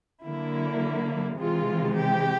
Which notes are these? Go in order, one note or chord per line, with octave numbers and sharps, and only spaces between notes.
D3 F#3 A#3 E4
C3 E3 G#3 F4
G4